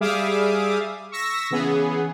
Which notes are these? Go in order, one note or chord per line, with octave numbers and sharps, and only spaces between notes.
G3 G#4 E5 F5 D6 D#6
C#6 E6 A#6 B6
C#3 E3 B3 G#4